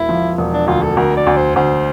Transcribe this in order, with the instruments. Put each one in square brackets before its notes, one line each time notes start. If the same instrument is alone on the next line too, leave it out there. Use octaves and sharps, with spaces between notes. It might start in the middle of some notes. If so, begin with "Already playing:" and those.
Already playing: [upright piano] E1 [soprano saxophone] E4
[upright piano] F3
E1
[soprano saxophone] D4
[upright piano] D2 [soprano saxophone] F4
[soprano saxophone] A4
[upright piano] D2 [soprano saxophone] A#4
[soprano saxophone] D5
[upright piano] D2
[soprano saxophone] C5
[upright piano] D2 [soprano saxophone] C5